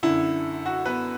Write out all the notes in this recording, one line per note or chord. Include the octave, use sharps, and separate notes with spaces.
F#2 D3 E4
F#4
B3 B4